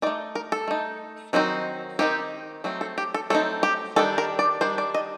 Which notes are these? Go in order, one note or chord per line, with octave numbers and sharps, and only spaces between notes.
A3 D#4 D5
A#4
A4
A3 D#4
D#3 F#3 C4 D#4
D#3 F#3 C4 D#4 G4
F#3 A3 C4 D#4
A4
G4
A4
F#3 A3 C4 D#4 A4
G4
D#3 G3 D4 A4
A#4
D5
D#3 G3 D4 C5
D5
D#5